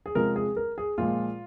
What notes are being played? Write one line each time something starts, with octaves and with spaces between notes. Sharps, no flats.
G#4
C3 F3 G#3 A#4
G#4
A#4
G#4
A#2 F3 G#3 F4